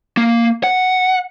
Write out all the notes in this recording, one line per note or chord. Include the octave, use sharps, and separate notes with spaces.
A#3
F#5